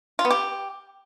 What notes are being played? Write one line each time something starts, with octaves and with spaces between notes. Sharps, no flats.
F4
B3
G4